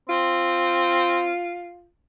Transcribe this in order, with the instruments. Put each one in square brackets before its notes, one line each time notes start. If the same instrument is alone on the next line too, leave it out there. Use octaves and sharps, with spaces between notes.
[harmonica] C4 [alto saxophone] F4